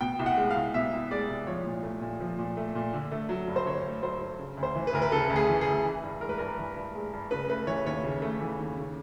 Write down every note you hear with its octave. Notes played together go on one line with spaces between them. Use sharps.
B2 G5
C2
F#5
G#3
F5
C2
B2 E5
C2
G#3 D5
C2
F3 C#5
A#2
A3
A#2
F3
A#2
A3
A#2
D3
A3
F#3
G2
C5
D3 C#5
A3
F#3 C5
G2
C#3
D2
C5
E3
B4
D2 A#4
B4
C#3 A4
D2
G#4
E3
D2 G#4
E3
G2
G#3 A#4
B4
G2 A#4
E3
G2
G#3
G2
C#3 B4
A3 B4
E3 C#5
D#2 C#5
C#3
A3
E3
D#2
C#3